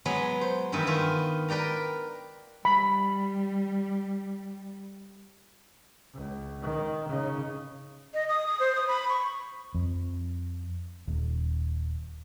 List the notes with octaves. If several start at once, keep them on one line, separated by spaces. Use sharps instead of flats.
F#3 G#3 B3
C5
G2 D#3 E3 B3
D#3 F4 F#4
A#4 B4 D5 G5 A#5
G3 B5
C#2
D#3
C#3 D#4
D#5
D#6
D#6
C5
D#6
B5
C#6
F2
D#1